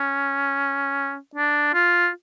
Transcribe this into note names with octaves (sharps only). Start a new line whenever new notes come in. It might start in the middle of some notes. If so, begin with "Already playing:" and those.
Already playing: C#4
D4
F4